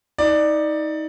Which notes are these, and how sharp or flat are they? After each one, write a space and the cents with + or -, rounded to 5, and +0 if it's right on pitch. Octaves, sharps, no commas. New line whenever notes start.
D#4 +25 D5 +15